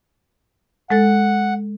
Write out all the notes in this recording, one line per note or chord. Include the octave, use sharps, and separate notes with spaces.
G#3 A4 F#5 A6